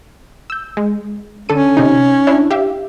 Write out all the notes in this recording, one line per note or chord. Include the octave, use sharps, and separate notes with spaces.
E6 G6
G#3
D3 C#4 A4 D#7
C3 D#4
D4 E4 C#5
G4 E5 F5